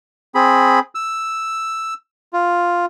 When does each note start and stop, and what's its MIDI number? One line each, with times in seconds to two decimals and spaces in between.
0.35 0.79 60
0.35 0.79 68
0.35 0.79 83
0.95 1.94 88
2.33 2.85 65